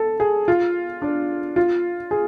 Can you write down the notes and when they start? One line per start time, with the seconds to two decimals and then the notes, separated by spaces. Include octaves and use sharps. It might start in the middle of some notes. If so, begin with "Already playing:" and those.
Already playing: A4
0.20 G#4
0.48 F4
1.02 D4
1.56 F4
2.11 G#4